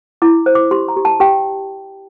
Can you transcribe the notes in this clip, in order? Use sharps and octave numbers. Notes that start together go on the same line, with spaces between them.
E4 D6
C5
D6
G4 C6
A#5
G4
A5
G4 G5